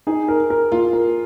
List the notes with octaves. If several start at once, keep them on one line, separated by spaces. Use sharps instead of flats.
D#4 G#4
A#4
A#4
A#3 F4
A#4